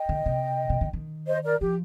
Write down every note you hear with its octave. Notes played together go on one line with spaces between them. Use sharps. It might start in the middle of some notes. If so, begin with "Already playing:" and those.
Already playing: D#5 G5
D3
C3
C3
D3
D#3
C5 D#5
A#4 D5
F3 G4